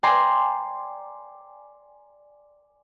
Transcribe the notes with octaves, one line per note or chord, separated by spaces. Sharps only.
D5 G5 G#5 A#5 C6